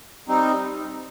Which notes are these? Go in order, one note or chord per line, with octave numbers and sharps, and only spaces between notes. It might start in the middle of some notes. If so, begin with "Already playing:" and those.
G3 C4 D#4